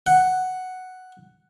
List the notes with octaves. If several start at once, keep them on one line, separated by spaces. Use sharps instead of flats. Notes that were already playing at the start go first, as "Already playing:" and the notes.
F#5